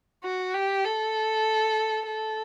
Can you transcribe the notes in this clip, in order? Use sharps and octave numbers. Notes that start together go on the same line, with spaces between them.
F#4
G4
A4
A4